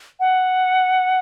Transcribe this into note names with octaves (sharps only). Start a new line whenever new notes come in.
F#5